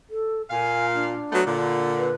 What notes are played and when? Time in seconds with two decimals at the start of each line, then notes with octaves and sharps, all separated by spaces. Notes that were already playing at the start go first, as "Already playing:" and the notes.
0.10 A4
0.50 A#2 F5 G#5
0.94 D4
1.31 F#3 A3 B3
1.45 A#2 D3
1.98 B4